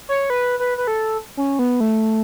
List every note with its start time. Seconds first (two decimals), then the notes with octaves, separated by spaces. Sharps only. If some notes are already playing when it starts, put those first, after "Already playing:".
0.09 C#5
0.30 B4
0.59 B4
0.78 B4
0.87 A4
1.37 C#4
1.59 B3
1.80 A3